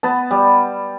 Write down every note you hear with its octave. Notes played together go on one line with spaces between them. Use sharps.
B3 A5
G3